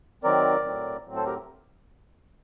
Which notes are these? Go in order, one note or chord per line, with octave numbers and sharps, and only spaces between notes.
D#3 F#3 C4 A#4 D5
A2 F#3 C4
A2 F#3 C4
A4 C5
G4 A#4